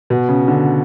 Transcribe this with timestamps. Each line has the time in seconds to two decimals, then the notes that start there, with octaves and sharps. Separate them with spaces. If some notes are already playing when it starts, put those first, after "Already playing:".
0.10 B2
0.29 C#3
0.48 D3